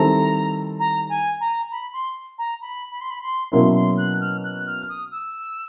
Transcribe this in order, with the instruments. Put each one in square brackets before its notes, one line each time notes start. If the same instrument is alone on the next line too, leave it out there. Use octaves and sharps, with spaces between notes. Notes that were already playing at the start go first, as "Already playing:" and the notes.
Already playing: [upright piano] D#3 G3 C4 E4 A4 [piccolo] A#5
[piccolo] A#5
G#5
A#5
B5
C6
A#5
B5
B5
C6
B5
C6
[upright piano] B2 F#3 A#3 C#4 E4 [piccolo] C6
[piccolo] C6
F#6
F6
F#6
F6
D#6
E6